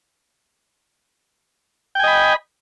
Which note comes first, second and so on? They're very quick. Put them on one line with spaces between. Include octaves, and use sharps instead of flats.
G5 G#5 D#5 B5